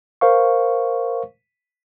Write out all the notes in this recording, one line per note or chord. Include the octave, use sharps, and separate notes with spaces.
A#4 C5 F5 C#6